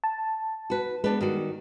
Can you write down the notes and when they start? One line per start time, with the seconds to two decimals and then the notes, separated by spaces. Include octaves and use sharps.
0.04 A5
0.70 F#4 B4
1.04 G#3 B3 D4 B4
1.21 D#3 G3 F#4